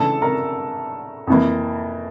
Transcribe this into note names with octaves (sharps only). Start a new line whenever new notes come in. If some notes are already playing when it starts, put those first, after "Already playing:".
Already playing: C#3 E3 A3 D4 A4 A5
A#4 A#5
F2 E3 A#3